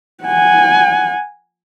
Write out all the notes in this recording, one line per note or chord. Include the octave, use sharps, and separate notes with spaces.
F#5 G#5